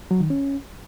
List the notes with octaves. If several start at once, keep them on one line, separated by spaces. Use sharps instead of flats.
F#3
D#3
C#4